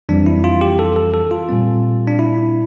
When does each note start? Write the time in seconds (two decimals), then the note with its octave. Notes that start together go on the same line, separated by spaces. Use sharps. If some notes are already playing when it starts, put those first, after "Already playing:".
0.09 F2 E3 G3 C4 D4
0.26 E4
0.44 F4
0.61 G4
0.79 A4
0.96 A4
1.14 A4
1.31 F4
1.49 A#2 G3 C4
2.07 D4
2.19 E4